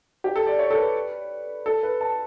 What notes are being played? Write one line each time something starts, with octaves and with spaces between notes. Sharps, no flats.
G4
A4
D5
C#5
A4
B4
A4
B4
A5